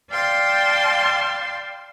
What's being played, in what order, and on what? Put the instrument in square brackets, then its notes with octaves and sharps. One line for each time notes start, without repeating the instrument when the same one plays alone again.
[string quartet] D5 F5 G5 A5 C6